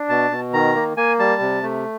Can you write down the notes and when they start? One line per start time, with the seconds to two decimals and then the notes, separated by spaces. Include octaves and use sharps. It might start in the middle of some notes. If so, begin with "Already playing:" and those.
Already playing: D4
0.09 B2 A5
0.31 B2
0.53 D#3 A#5
0.75 A#3
0.97 A#3 G#5
1.19 G3 A5
1.41 C3
1.63 A3